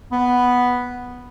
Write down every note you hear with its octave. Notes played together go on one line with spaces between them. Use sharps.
B3